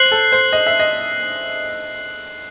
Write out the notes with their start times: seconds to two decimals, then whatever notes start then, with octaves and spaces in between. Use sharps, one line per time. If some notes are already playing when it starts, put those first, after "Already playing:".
Already playing: C5 F#6 C7 F#7
0.11 A4
0.32 C5
0.53 D#5
0.67 E5
0.80 D#5